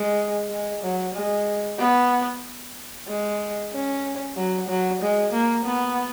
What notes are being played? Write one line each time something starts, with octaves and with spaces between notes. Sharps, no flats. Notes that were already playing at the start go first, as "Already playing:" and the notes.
Already playing: G#3
G#3
F#3
G#3
B3
G#3
C#4
F#3
F#3
G#3
A#3
B3